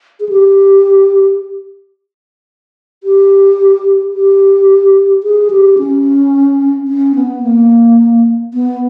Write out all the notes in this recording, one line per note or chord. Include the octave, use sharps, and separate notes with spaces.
G#4
G4
G4
G4
G#4
G4
C#4
C#4
B3
A#3
B3